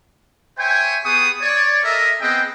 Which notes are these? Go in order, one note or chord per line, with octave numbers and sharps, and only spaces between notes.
C5 C#5 E5 G5 G#5
B3 G4 G#4 C#6 D#6
C#5 D5
A4 A#4 D#5 E5
B3 C4 G#4 D#5 G5